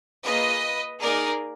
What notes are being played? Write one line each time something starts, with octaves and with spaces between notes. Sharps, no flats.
A#3 F4 G#4 B4 D#5
A#3 D#4 G#4 A#4 D5